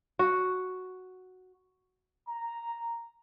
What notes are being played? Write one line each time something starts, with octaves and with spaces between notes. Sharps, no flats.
F#4
A#5